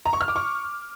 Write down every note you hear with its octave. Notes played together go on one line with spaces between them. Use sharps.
A#5
C#6
F6
D6
C#6